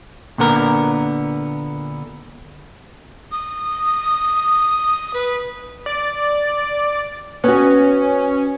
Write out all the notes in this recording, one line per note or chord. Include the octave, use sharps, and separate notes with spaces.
A#2 D3 B3 A#4
D#6
B4
D5
B3 C#4 F#4